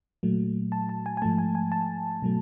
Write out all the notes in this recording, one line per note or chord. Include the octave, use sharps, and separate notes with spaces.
A#2 F#3 A3
A5
A5
G#5
G#5
G#2 F3 A3 A5
G#5
G#5
A5
B2 F#3 A3